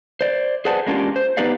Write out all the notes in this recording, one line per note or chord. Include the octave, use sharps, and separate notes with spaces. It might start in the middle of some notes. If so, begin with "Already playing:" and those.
C5 D5
G#4 B4 C5 D5 F#5 A5
G#3 A#3 C#4 D4 F4 G4
C5
B3 D#4 G4 B4 D5 F5